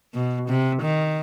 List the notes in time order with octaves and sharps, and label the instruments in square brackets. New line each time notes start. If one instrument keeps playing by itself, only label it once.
[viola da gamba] B2
C3
D#3